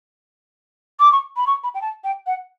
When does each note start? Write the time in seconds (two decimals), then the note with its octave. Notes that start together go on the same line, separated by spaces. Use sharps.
1.00 D6
1.12 C#6
1.37 B5
1.47 C#6
1.64 B5
1.75 G5
1.82 A5
2.04 G5
2.27 F#5